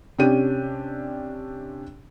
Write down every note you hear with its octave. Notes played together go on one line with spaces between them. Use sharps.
C3 C#4 D4 G4 G5 D#7